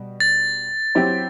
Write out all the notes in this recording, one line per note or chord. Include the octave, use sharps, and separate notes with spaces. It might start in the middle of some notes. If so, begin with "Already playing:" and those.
Already playing: B2 G3
A6
F#3 C4 E4 G4 C5